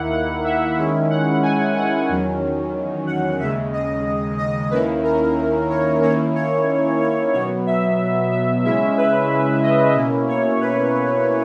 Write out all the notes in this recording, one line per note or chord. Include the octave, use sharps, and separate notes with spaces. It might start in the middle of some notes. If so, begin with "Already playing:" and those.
Already playing: D#2 D#3 A#3 E4 F#5
F#5
E5
D#3 G#3 C#4 E4
F#5
G#5
F#5
E2 D#3 F#3 C#4
F#5
D#2 C#3 G#3 E5
D#5
D#5
D#2 D#3 A#3 C#4 E4 B4
A#4
C#5
D#3 A#3 C#4 E4 C#5
C#5
C#5
B2 F#3 B3 C#5
E5
E5
C#3 G#3 C#4 E4 E5
B4
D#5
B2 A#3 C#4 E4
C#5
B4